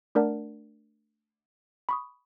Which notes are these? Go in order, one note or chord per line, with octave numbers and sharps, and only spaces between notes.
A3 D4 A#4 D5 F#5 A5
B5 C#6 D#6